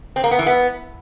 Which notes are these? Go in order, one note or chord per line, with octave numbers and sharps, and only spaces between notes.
C4
A#3
B3
E3
B3